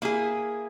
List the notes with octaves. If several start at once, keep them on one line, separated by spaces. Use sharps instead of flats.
A#3 E4 G#4